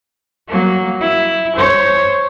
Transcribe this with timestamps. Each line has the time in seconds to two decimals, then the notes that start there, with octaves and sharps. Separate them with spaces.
0.48 F#3 A#3
1.01 E4
1.56 C5 C#5